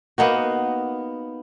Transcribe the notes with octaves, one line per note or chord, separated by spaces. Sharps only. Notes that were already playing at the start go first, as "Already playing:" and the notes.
A#3 B3 D#4 F#4